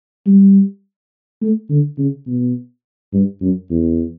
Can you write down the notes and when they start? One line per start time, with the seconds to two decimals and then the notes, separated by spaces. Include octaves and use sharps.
0.27 G3
1.41 A3
1.70 D3
1.98 C#3
2.27 B2
3.13 G2
3.41 F#2
3.70 E2